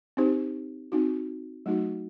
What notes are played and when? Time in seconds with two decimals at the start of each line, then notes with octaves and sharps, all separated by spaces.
0.17 C4 D#4 G4 C5
0.92 C4 D#4 F#4
1.66 F#3 A3 D#4 F#4